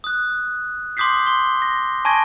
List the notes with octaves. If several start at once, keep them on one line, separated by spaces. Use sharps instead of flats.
D#6 F#6
C6 D6 D#6 G6 B6 C7
C6 G7
A#6
G#5 A5 C#6 G#6 A#6